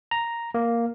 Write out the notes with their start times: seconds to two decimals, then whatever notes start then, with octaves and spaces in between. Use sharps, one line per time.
0.11 A#5
0.54 A#3